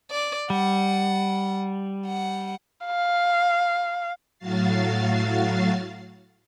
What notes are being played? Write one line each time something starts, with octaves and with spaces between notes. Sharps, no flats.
D5
G3 F#5
F#5
F5
A2 F#3 F#4 F5 A6 C7